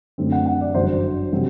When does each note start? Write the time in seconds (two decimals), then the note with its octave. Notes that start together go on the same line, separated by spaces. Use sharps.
0.18 F#2 D3 A3 C4
0.32 F#5
0.46 F#5
0.61 D5
0.74 G1 F#2 F#3 C5
1.33 C3 F#3 C4